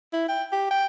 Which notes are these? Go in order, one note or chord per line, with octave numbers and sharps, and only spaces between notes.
E4
G5
G4
G5